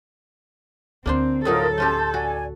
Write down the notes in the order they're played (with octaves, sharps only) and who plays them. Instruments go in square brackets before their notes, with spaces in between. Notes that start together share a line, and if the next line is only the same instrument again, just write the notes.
[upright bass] D2 [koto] A#3 D4 C5 [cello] C4
[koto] A2 F#3 D#4 [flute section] F4 A#4 D#6 [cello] A4
[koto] A3 C#4 G4 [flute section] A5 C6 G6
[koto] F#4 [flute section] D5 G#5